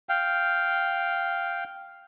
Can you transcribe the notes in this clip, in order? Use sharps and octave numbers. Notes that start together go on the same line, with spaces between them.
F5 G5